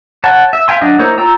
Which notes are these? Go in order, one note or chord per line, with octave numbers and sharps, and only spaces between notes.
C#5 F#5 A5
E5
E5 F5 G5 G#5 C6
F#3 D4 D#5
A#3 D#4 E4 C5 C#5
F4 G5 A#5 E6